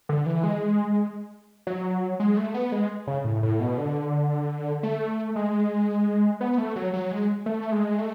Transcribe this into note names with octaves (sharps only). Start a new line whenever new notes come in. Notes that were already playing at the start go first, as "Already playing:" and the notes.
D3
E3
G#3
F#3
G#3
A3
B3
G#3
C#3
A2
A2
B2
D3
A3
G#3
B3
A3
F#3
F#3
G#3
A3
G#3
A3